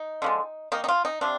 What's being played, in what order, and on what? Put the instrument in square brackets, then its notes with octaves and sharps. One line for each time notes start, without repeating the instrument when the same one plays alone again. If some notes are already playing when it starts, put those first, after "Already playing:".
Already playing: [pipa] D#4
D3 F3 G#3
D#3 A#3 D#4
D#4
F4
D#4
C3 F3 C4 D4